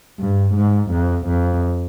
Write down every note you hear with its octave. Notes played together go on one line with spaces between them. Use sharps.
G2
G#2
F2
F2